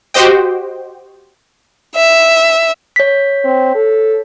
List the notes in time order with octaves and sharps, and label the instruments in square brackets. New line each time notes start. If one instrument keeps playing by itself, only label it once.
[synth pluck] F#4 G4 C5 D#5 G5
[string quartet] E5
[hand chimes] C#5 B6
[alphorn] C4
A4